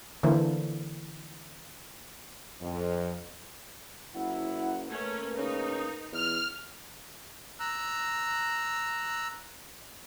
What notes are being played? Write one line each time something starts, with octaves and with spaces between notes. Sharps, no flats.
D3 E3 A#3 E4 C5
F2
F#1 F#3 E4 F#5
A3 A#3 C#4 A#4 B4
C#3 D#4
E2 F6
A#5 E6 F#6